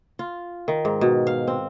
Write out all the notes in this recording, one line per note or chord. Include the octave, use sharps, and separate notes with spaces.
F4
D#3
G#2
B2
F5
C4